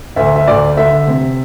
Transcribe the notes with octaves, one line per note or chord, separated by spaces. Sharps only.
D2 E5
E5
D2 D5
D3 E5
C3